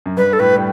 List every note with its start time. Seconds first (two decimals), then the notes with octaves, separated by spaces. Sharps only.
0.06 F#2
0.17 G2 B4
0.33 A4
0.39 A2 B4
0.56 G3